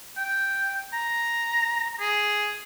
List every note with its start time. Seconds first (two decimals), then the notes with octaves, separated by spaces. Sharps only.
0.17 G5
0.93 A#5
2.00 G#4